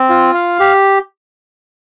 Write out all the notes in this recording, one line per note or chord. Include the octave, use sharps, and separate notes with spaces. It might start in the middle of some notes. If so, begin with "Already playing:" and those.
Already playing: C4
F4
F5
G4